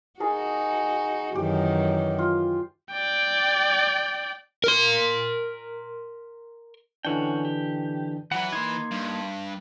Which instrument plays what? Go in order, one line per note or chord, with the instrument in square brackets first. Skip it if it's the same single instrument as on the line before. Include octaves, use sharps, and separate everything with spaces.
[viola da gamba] D#4 F#4 [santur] G#4 A#4 A5
[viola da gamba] F#2 D#3 E3 [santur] G4
[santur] F4
[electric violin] D5 G5
[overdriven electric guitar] A#4 C6
[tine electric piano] D3 E3 D4 [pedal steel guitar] C#4 F#4 G5
[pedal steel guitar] G4
[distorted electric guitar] E3 B4 [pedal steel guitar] F#3 F#5
[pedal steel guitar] A#3 D#4 [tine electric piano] C6 G#6
[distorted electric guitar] G2